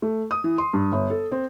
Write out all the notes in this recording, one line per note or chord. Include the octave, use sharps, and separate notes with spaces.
A3
D#6
E3
C6
G2
G1
A4
C4